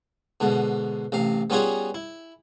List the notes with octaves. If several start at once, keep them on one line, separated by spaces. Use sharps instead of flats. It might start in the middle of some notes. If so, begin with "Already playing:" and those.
G#2 B2 D3
A1 C3 F5
G3 B3 C#4 F4 F#4 G#4
E4